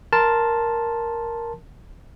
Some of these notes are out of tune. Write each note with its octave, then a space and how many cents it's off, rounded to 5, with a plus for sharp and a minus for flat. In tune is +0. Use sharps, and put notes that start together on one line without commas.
A#4 +0 A5 +0 C6 +0